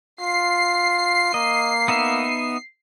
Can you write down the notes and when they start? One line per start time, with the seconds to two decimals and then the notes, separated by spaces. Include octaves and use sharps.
0.21 F4 C7
1.34 A#3 D#5
1.88 B3 D#4 E5